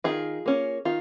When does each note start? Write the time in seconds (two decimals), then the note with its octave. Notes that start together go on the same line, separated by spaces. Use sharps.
0.04 D#3 F4 G#4
0.46 A#3 C#4
0.85 D#3 F4